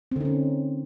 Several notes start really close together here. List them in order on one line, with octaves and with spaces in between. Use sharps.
C4 D3 D#4 C#4